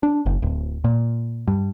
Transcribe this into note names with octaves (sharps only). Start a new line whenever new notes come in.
D4
F#1
D1
A#2
G2